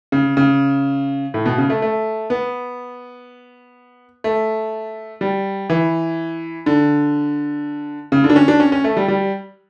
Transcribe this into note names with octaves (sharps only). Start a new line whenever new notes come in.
C#3
C#3
A2
B2
C#3
A3
A3
B3
A3
G3
E3
D3
C#3
D3
D4
C#4
D4
C#4
C#4
A3
G3
G3